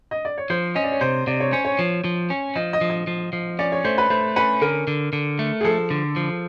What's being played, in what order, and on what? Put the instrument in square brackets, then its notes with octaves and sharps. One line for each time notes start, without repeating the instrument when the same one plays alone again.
[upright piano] D#5
D5
C#5
[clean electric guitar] F3 [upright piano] C5
[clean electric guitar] C#4 [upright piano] D#5
[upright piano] D5
C#5
[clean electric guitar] C3 [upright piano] C5
[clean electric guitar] C3 [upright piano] D5
[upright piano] C#5
[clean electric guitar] C#4 [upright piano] C5
[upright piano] C#5
[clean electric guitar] F3
F3
C#4
[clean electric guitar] F3 [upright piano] D#5
[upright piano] D#5
[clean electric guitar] F3
[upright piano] D#5
[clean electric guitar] F3
F3
[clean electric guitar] C#4 [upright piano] D5
[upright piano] C#5
[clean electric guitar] A3 [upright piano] C5
[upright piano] B4
[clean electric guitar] A3 [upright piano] C5
[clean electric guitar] C#4 [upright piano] B4
[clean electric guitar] D3 [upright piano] A#4
[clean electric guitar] D3
D3
A3
[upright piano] G#4
[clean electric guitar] F3 [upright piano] A4
[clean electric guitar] D3
F3